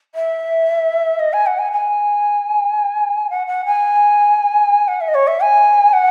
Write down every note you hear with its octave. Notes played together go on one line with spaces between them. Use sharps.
E5
D#5
G#5
F#5
G#5
G#5
F#5
F#5
G#5
F#5
E5
D#5
C#5
E5
G#5
F#5